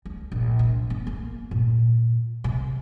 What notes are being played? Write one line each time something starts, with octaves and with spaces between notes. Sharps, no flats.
D2
A#1
C3
B3
A#3
A#2
C3